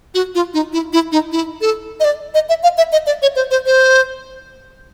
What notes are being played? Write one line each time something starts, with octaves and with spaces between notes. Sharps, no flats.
F#4
F4
D#4
E4
E4
D#4
E4
A4
D#5
D5
D#5
E5
F5
E5
D#5
D5
C#5
C5
C5
C5